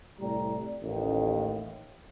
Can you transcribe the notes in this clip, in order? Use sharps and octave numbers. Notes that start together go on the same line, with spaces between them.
C2 A2 G3 D5 A#5
A1 D#2